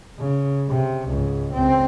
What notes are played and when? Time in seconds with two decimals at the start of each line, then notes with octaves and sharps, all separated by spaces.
0.18 C#3
0.69 C3
1.08 C#2 G#2
1.53 C#2 C4